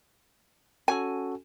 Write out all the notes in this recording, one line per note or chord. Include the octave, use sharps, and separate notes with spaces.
C#4 F#4 A4 G#5